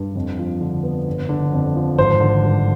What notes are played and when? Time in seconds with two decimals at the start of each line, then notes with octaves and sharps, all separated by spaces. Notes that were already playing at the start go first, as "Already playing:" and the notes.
Already playing: G2
0.15 F2
0.39 F3
0.61 D3
0.83 B3
1.07 G1
1.29 D3
1.52 F2
1.76 F3
1.98 G#1 C5
2.20 D3
2.43 G2